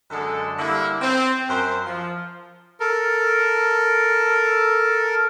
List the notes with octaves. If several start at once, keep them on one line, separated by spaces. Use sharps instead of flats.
F#2 D3 G#3 A4
D3 G3 A#3 E4
C4
F#2 A#4 C5
F3
A4 A#4